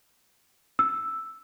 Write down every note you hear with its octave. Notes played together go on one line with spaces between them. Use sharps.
E6